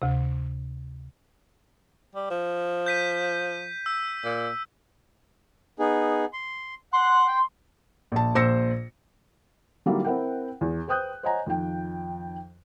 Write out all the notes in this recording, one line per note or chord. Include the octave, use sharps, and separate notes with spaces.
D2 C3
G3
F3
G6 B6 D#7
E6
A#2
B3 D#4 G#4
C6
F#5 C6 F#6
G5
A#1 A5
A#1 C5 E6 A#6 C#7
D3 F#3 G3 A#3 D#4 E4
C4 E4 A#4 F#5 G5
E2
B4 C5 G5 D#6 F#6 G6
C5 C#5 D#5 F#5 G#5 A#5
F2 D#3 F3 G5